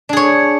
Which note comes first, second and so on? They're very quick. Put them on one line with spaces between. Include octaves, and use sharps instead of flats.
D4 G#4 C#5